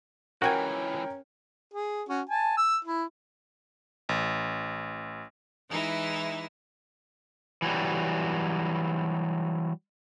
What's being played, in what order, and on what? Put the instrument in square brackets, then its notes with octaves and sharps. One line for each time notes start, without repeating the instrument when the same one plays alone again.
[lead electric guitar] C#2 E3 [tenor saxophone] C#4 [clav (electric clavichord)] F#4 G#5 [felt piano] A#4 G5
[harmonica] G#4
C#4 F#4
G#5 A5
E6
E4
[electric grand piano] A1
[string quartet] E3 G#3 D#4 E4
[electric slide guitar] E3 F#3 G3